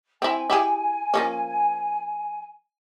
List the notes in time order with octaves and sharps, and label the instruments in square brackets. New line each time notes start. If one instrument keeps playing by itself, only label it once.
[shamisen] C4 E4 [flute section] G#5
[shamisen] E4 G4 G#4
F3 A#3 C#4